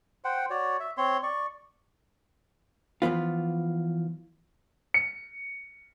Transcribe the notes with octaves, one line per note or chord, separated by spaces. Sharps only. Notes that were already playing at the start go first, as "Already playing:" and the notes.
C5 F#5 G5
F#4 C#5 D5
E5
C4 C#5 C6
D5 C#6
E3 F3 B3 F4
C#7